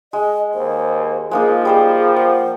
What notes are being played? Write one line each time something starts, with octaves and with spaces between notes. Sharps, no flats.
G#3 D#5
D#2 C5
F3 G#3 A#3 D#4 G#4
G3 C5 D5
C5 F#5